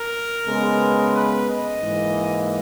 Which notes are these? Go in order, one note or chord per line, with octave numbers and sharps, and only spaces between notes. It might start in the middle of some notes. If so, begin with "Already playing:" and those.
Already playing: A#4
C#3 G#3 B3
B4
D#5
G#2 E3 A#3